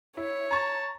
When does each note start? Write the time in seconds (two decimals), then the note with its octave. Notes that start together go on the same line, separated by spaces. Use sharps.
0.17 E4 C#5
0.51 A5 A#5 C#6